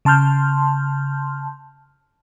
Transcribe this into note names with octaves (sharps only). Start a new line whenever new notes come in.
C#3 A5 C6 F6 G6